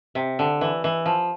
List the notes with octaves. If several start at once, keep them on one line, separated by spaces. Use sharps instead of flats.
C3
D3
E3
E3
F3